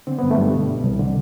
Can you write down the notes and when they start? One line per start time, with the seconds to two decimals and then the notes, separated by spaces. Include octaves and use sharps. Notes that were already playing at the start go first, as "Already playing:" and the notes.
0.07 D3 C4
0.19 G2 B3
0.31 A3
0.38 G2 G3
0.53 B2
0.68 C2
0.84 C2
0.99 D3